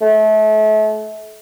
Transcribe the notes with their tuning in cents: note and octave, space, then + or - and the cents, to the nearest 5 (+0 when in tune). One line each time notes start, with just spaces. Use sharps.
A3 -35